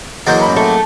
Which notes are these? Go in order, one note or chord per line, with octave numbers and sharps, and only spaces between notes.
E3 F#3 G#3 A#3 G6 A6
A1 B5
A3